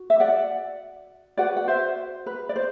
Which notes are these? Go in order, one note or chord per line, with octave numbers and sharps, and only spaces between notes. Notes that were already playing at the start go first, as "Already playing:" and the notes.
Already playing: F#4
E5
D5 F#5
F#4 B4 D5 F#5
F#5
C5 E5
B4
D5
C5